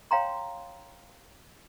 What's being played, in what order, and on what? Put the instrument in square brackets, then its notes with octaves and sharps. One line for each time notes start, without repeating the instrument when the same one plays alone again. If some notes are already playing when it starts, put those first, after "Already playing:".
[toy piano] C#5 F5 G5 A#5 C6